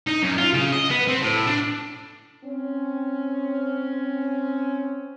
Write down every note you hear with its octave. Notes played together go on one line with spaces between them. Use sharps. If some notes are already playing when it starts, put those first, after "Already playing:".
D#4
F#2
F4
C#3
D#5
B3
C4
A2
D4
C4 C#4